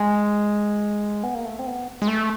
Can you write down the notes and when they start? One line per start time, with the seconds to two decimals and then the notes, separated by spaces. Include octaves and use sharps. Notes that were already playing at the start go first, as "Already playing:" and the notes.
Already playing: G#3
1.23 B3
1.34 A#3
1.45 A3
1.59 C4
1.66 B3
2.02 G#3
2.08 A3